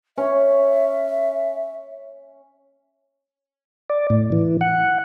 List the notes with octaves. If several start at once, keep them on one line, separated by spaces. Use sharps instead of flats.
C#4 C#5 E5
D5
A2
E3
F#5